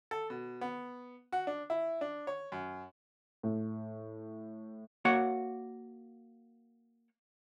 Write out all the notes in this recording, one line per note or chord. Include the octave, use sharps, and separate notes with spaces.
A4
B2
B3
F#4
D4
E4
D4
C#5
F#2
A2
A#3 F#4 C#5 F#5